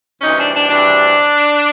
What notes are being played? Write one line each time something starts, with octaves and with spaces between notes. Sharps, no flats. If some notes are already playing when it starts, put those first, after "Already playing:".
D2 C3 E3 G3 C#4 D#4
D4
D4
D2 C3 E3 G3 D4